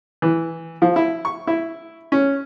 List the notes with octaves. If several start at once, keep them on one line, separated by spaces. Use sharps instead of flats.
E3
F3
E4
C#6
E4
C#4